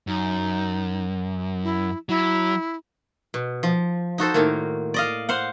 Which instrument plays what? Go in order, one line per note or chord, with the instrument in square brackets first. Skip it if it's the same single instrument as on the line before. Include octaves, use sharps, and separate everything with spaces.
[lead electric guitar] F#2 [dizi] D#4
[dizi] E4
[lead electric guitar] F#3 [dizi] E4
[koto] B2
F3
D#4 F#4 A4 C5
A2 D#3 A#3
D5 D#5 F5
C5 F5 F#5